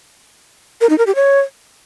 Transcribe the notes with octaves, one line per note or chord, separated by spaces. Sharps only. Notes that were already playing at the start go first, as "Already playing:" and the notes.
A#4
D#4
A#4
G4
C#5